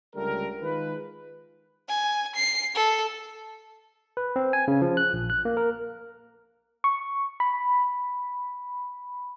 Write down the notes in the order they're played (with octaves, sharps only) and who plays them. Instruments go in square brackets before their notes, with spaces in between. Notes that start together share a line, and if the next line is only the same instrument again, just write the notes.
[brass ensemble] C#2 D3 G3 A3 A#4
D#3 G#3 F4 B4
[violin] G#5
C7
A4
[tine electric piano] B4
C4
G#5
C#3
F3
F#6
A#1
F#6
A#3
A#4
[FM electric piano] C#6
B5